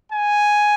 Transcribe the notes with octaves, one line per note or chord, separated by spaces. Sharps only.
G#5